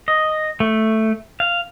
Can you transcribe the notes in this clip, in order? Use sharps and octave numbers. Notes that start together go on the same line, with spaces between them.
D#5
A3
F5